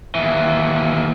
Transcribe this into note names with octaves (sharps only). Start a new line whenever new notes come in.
D#2 E3